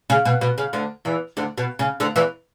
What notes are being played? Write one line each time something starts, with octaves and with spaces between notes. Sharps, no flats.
C#3
B2
B2
C#3
D2 D3
E2 E3
D2 D3
B2
C#3
D2 D3
E2 E3